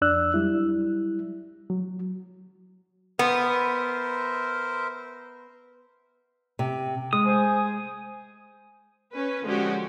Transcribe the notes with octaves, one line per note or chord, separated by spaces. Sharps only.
F2 D4 D5 E6 F#6
F#3 G3 E4
F#3
B3 A#4 C5 E5
C3
G#3 D#6
C5 G#5
C#4 B4
D3 F3 G#3 C#4 F#4 G4